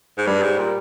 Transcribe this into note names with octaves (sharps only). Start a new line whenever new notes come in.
G#2
G2 G3
G#2
A#2